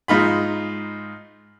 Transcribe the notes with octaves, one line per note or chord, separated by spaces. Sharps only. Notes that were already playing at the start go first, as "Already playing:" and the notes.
G#2 D#4 F4 B5